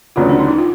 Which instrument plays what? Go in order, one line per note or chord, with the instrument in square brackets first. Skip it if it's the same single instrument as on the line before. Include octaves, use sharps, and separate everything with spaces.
[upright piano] E1 D2 C#3 F#3 B3 [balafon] F4
[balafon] D4
D#4
E4
F4